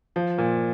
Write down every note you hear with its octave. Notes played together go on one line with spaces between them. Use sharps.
F3
A#2